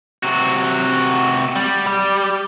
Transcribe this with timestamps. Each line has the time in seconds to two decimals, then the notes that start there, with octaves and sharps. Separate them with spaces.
0.23 C3 F#4
1.56 G3
1.87 G3